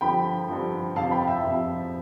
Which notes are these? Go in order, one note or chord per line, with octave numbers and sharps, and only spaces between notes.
G2 D3 F3 G5 B5
G2 D3 F3
F2 C3 F3 F5 A5
G5 B5
E5 G5
F2 C3 F3